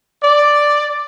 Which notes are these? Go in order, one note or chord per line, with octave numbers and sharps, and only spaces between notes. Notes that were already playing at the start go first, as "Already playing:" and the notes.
D5